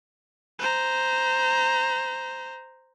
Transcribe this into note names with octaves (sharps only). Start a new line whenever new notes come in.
C5 A#5